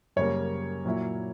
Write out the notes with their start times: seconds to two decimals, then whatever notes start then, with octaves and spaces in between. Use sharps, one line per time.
0.16 F#2 C#3 G3 A#3 C#5
0.85 A#2 F#3 A#3 E4